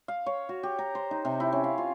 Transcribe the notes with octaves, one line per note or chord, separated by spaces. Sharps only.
F5
C#5
F#4
G4
A#5
C5
D#4
C3
E4
C#4
F5
F4